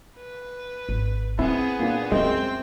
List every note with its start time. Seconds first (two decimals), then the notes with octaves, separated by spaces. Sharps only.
0.17 B4
0.89 G#1
1.39 B3 C4 E4 G#4
1.79 A#2 D4
2.12 F#2 G#3 B3 C4 F4 G5